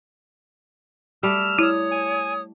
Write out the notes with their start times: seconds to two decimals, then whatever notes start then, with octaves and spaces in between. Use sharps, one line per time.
1.23 G3 A3 E6 F6
1.59 E4 C#5 D#6
1.91 G#5